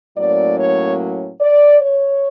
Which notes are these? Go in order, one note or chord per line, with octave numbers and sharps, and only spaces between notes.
A2 F#3 A#3 C#4 D5
C#5
D5
C#5